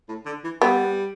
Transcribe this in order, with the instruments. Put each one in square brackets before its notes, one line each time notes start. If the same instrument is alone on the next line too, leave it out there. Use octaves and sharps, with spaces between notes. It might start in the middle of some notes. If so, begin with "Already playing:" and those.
[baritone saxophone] A2
D3
E3
[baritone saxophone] G3 [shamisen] B3